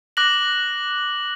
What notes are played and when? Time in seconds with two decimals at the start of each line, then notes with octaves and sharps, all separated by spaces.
0.17 D6 F#6 A#6 F#7